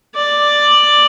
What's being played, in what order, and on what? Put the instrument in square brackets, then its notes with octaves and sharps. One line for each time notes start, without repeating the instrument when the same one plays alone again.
[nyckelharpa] D5